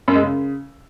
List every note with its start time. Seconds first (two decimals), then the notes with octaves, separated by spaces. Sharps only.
0.08 F#2
0.15 G#3
0.23 C#3